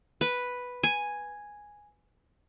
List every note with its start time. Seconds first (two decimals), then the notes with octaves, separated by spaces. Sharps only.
0.21 B4
0.83 G#5